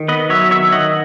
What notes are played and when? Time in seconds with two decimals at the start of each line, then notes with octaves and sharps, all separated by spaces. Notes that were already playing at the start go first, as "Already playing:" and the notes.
Already playing: D#3
0.08 B3 B4 D#5
0.30 F#3 C#5 E5
0.51 D#3 C#5 E5
0.72 D#3 D#5 F#5